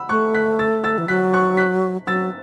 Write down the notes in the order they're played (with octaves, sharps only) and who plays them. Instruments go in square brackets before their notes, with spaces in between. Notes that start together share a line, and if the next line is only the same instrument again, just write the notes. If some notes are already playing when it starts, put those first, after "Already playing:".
Already playing: [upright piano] F#5 B5 E6
[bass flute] A3 [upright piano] C#6 F#6
[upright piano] F#6 B6
E6 A6
E6 A6
[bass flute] E3
[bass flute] F#3 [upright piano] F#6 B6
[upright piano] C#6 F#6
F#6 B6
[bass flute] F#3 [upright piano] E6 A6